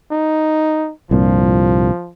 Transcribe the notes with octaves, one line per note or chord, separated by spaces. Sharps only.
D#4
C2 G2 A#2 F3